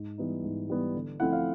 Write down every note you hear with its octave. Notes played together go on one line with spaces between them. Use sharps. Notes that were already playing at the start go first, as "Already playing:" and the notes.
Already playing: G#2
E3 G3 B3 D#4
G#2
E3 G3 B3 D#4
D3
F3 A3 C4 E4 F#5
F5